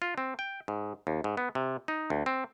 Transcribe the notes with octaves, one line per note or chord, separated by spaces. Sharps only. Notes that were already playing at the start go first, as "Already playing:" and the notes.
F4
C4
G5
G#2
D#2
G#2
B3
C3
D#4
D2
C4